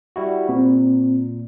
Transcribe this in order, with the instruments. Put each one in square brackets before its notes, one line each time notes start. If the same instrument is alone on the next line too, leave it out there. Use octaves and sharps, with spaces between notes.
[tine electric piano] G3 E4 F#4
[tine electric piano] A#2 [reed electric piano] C4